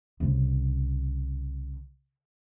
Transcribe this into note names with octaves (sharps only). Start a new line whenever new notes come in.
C2 C#3